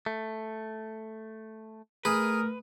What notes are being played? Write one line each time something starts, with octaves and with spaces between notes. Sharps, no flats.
A3
A3 G#4 A#4 B4